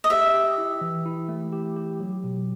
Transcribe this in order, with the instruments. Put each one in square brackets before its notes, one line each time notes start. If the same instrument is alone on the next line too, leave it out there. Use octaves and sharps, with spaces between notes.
[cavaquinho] D#5
[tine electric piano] G4 [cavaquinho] E5
[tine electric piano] G4
E4
E3
E4
A3
G4
G4
F#3
B2